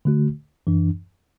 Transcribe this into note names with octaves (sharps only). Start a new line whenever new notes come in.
D3 A3 F#4
F#2 E3 D4